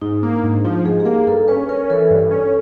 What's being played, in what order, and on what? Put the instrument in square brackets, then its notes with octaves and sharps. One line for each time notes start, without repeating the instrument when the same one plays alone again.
[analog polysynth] G#2 [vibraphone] D#4
[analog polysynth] A#3
[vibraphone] D4
[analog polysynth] G#2
[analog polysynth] F3 [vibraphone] D#4
[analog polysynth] G#2 [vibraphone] G#4
[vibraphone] G4
[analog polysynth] A#3 [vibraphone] G#4
[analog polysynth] G2 [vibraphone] A4
[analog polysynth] C#4 [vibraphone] B4
[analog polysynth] C#4 [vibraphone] A#4
[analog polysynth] E3 [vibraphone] A4
[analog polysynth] G2
C#4